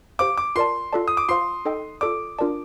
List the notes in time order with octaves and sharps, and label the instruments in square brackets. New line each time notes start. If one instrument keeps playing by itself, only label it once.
[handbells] G4 C5 F5 [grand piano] D6
[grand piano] D6
[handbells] F4 A#4 D5 A5 [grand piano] C6
[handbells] F4 A4 D5 A5
[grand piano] D#6
D6
[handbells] F4 C5 F5 [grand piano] C6
[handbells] D#4 A4 D#5 G5
[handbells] F4 A4 D5 [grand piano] D6
[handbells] D4 F4 A#4 D5 A5